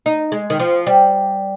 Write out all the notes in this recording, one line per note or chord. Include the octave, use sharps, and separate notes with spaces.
D#4
G#3
D#3
F3
G3